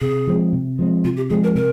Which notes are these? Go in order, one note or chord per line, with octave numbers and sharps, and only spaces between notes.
C3 G#4
F3 G#3 C4
C3
F3 G#3 C4
C3 F4
G4
F3 G#3 C4 G#4
A#4
C3 A#4